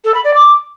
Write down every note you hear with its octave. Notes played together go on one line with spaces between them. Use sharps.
A4
B5
D5
D6